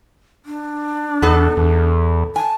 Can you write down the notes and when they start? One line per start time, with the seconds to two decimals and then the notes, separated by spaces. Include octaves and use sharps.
0.46 D4
1.22 E2 B3 A4
1.57 E2
2.36 G#5 A5